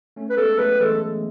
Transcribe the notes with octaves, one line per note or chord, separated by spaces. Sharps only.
A3 C#4
B4
G#3 B3 A4
F#3 A3 B4
E3 G#3 A4